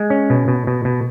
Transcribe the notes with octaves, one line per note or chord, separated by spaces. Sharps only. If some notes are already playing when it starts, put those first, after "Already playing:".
Already playing: G#3
C#4
B2
B2
B2
B2